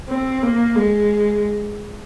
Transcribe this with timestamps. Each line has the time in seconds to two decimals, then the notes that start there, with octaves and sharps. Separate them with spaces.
0.08 C4
0.43 A#3
0.76 G#3